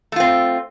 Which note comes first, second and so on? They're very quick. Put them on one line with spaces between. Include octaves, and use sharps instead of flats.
A3 F4 C4